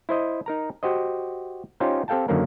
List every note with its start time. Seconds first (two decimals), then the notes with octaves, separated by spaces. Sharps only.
0.09 E4 C5 D#5
0.46 D#4 A#4 A#5
0.83 F#4 G4 C5 D#5
1.80 C#4 D#4 F4 G4 C5
2.08 C4 G4 A4 F5 G5 A5
2.28 F#2 D3 D#3 A#3 C#4 A#4